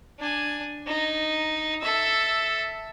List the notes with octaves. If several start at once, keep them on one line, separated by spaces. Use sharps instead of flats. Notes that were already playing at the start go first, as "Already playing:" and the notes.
D4 G#5
D#4
A4 E5